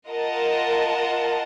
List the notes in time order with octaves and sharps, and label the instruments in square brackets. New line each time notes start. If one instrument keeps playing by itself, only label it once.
[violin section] F4 A#4 D#5 F#5 A5